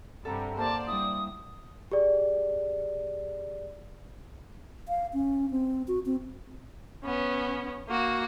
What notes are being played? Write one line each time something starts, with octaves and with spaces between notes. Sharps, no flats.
G2 C3 G3 A4 F#5 A#5
A#3 A#4 C5 D5 A5
G3 D4 E4 D#6
G4 G#4 D5
F5
C#4
C4
F#4
C4
B3 C#4
A#3 F#4